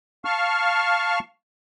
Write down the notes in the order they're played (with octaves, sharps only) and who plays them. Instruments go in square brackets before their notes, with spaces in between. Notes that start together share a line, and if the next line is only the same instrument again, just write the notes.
[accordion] F5 A5 C#6 F6